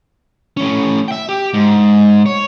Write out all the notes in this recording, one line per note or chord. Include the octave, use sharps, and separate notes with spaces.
A2 C#4
E5 G5
G4
G#2
C#5